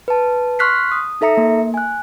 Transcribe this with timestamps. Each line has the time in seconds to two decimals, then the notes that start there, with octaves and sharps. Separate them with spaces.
0.08 B4 A5
0.59 C6 C#6 F6 F#6 B6 C7
0.92 D#6
1.21 D#4 A4 E5 A#5 C#7
1.37 A#3
1.74 G#5 F#6